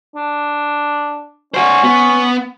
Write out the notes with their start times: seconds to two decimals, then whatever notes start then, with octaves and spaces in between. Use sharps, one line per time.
0.16 D4
1.54 C#4 F#4 C5
1.83 B3